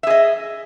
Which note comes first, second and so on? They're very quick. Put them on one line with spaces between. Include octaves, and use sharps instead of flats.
E5 G#4 D#5